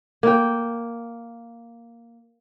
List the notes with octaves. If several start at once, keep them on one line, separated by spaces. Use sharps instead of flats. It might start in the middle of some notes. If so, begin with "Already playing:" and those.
A#3 G5